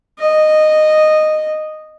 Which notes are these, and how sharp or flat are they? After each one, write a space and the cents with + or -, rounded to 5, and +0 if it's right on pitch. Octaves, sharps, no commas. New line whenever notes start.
D#5 -10